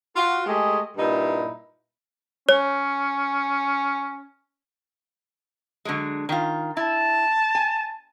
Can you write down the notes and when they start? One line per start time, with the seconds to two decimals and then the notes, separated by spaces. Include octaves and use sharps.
0.16 F4 F#4
0.46 G#3 A3 G4 G#4 D#5
0.97 G2 A#2 D#4 E4
2.49 C#4 C#5
5.85 D3 F#3 G#3
6.29 D#3 F4
6.77 E4 A5
7.55 G#5